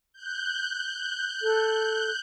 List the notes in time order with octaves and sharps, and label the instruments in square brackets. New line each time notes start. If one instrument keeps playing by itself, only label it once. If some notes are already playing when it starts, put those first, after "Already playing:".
[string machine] F#6 G6
[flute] A4